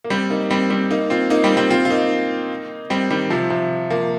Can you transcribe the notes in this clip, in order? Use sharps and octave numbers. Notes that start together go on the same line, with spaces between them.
A#3
G3 C4
A#3 D#4
G3 C4
G3 C4
A#3 D#4
C4 F4
A#3 D#4
G3 C4
G3 C4
C4 F4
F4
A#3 D#4
G3 C4
D#3 G3
C3 F3
C3 F3
F3 A#3